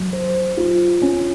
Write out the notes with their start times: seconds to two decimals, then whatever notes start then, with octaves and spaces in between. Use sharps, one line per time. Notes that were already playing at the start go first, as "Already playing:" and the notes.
Already playing: F#3
0.13 C5
0.57 F4
1.02 C#4